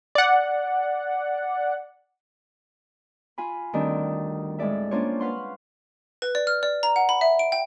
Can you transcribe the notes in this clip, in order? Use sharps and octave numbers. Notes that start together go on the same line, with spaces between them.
D5 F#5
F4 G#5 B5
D2 D#3 G3 C4 D4
A2 G#3 D4 D5 E5
A#3 C#4 D4 F4 C5 C#5
B4 F5 F#5 C6 C#6
B4
D5
F6
D5
A#5
F#5
B5
E5
D7
G5